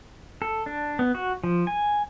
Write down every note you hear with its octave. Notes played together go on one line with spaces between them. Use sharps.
A4
D4
B3
F#4
F3
G#5